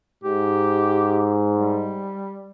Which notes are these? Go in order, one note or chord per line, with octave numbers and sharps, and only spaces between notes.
G#2 G4
G3